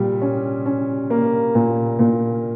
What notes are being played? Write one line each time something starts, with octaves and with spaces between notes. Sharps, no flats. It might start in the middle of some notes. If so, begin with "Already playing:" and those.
Already playing: A#2 G3
C#4
C#4
A#3
A#2
A#2